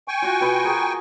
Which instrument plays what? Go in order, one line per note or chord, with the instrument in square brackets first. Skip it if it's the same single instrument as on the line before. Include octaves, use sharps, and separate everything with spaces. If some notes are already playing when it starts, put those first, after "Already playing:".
[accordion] G5 G#5 C#6
[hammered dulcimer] F4 F#4
B2 B4 C6
G#4 A#4